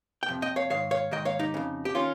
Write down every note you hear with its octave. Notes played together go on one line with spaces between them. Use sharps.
G5
F2 C3
D#5 G5
C#5 F5
G#2 D#3 C#5 F5
C#5 F5
G#2 D#3 D#5 G5
C#5 F5
D#4 G4
F2 C#3
G4
D#3 C#4 F4